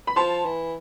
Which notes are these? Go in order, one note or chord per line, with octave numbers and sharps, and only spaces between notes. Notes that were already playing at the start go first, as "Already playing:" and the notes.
B5
F3 A5 C6
E3